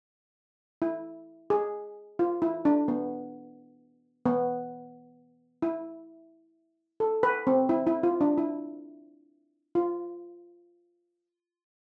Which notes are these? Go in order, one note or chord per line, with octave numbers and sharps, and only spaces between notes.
E4
G#4
F4
E4
D4
B3
B3
E4
A4
B4
C4
E4
E4
F4
D4
E4
F4